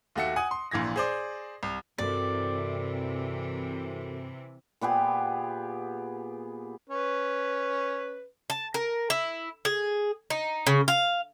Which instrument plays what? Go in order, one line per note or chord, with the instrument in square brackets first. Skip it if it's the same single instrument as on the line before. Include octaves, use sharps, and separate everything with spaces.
[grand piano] D#2 A3 F#4 E5 C#7
F#5 G#5 D#6
C6
A#1 A#2 E3 G#6 A#6
G#4 C5 D5
C2
[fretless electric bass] G2 C4 [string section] C3 E3 [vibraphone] F#4 A4 A#4 [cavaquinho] D5
[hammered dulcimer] A#2 B3 G4 G#4
[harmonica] C#4 B4
[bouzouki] A5
A#4
E4
G#4
D#4
C#3
F5